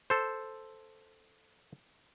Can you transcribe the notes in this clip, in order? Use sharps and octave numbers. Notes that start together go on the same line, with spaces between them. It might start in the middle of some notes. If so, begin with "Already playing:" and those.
A4 C5